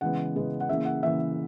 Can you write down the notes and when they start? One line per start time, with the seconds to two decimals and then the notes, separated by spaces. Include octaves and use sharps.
0.01 C#3 E3 G#3 B3 F#5
0.36 C#3 E3 G#3 B3
0.60 F#5
0.69 C#3 E3 A#3 E5
0.85 F#5
1.03 C#3 E3 A#3 E5